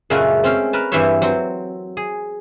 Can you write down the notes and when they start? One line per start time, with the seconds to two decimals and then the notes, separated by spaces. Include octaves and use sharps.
0.10 F#2 A#2 C#3 G#3 A3 F#4
0.44 C4 C#4 F5
0.73 A#4 B4 A5
0.92 G2 E3 C4 C5 C#5 E5
1.22 F#3 C4
1.97 G#4